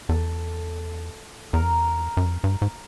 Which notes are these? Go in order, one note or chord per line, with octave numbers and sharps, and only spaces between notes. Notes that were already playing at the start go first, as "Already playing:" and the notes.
E2 A4
E2 A#4
F2
E2
F#2
F2
G2
G#2